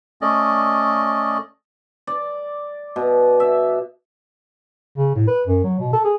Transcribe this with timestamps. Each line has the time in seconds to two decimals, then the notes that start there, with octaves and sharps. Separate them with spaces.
0.22 A3 C#4 D5 D#5
2.07 D5
2.96 B2
3.40 E5
4.97 C#3
5.15 A2
5.28 B4
5.47 F#2
5.64 F#3
5.80 B2
5.93 A4
6.05 G#4